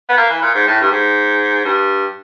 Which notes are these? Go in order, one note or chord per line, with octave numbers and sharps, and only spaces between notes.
B3
A#3
E3
A#2
G#2
A2
G2
G#2
G2